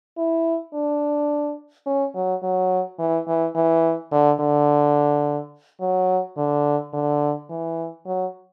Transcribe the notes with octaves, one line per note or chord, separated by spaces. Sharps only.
E4
D4
C#4
F#3
F#3
E3
E3
E3
D3
D3
F#3
D3
D3
E3
F#3